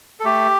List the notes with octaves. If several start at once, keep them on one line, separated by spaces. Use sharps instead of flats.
A4
A3 G4